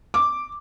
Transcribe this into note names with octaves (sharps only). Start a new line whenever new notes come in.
D6